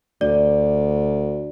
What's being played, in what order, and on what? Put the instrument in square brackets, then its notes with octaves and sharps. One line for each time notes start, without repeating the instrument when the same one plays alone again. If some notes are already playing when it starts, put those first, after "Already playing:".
[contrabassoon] D2 [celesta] D5